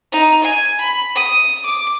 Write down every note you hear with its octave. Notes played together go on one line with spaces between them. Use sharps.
D#4
G#5
B5
D#6
D6